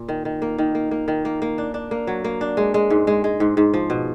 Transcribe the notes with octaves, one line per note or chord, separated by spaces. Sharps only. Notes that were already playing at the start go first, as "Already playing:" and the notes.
Already playing: A#2
D#3
D#3
A#3
D#3
A#3
A#3
D#3
A#3
A#3
D4
D4
A#3
F#3
A#3
D4
G#3
G#3
G#2
G#3
G#3
G#2
G#2
F3
B2